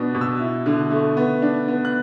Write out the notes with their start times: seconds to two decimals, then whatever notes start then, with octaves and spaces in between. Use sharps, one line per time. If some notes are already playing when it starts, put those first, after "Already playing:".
Already playing: B2 B3 D4
0.15 B2
0.21 E6
0.40 E4
0.66 D3
0.91 A3
1.17 B3
1.42 D4
1.68 B3
1.85 F#6